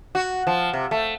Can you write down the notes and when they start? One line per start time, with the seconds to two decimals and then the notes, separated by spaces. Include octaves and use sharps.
0.15 F#4
0.47 F3
0.73 C3
0.91 A3